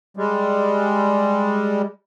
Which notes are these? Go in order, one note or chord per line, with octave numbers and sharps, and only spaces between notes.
G3 G#3